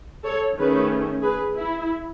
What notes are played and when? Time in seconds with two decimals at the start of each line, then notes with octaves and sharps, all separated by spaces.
0.24 A4 C#5
0.57 D#3 A3 C#4 G#4 B4
1.23 G#4 B4
1.56 E4